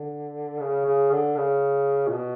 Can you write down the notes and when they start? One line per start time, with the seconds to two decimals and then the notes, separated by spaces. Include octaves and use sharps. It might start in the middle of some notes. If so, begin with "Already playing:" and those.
Already playing: D3
0.61 C#3
0.86 C#3
1.12 D3
1.37 C#3
2.08 A#2
2.13 B2